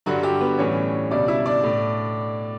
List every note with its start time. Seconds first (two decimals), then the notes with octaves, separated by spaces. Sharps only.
0.06 G2 D3 F#3 G3 F#4
0.23 G3 G4
0.41 B3 B4
0.58 A2 E3 G3 C#4 C#5
1.11 C#2 B2 G3 D4 D5
1.28 E4 E5
1.46 D4 D5
1.64 A2